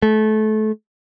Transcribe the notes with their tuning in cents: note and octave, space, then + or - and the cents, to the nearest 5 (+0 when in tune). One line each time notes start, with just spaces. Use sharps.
A3 -25